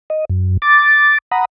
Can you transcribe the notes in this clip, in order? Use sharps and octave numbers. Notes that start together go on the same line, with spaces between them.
D#5
F#2
D6 A6
F#5 A#5 B5 D#6